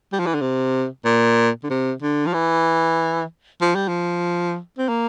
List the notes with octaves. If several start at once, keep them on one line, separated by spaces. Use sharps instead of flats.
G3
F3
E3
D3
C3
A#2
D3
C3
D3
F3
E3
F3
G3
F3
C4
A#3